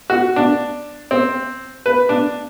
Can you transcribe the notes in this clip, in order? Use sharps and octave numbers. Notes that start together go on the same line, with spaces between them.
F#4
D4
C4
B4
D4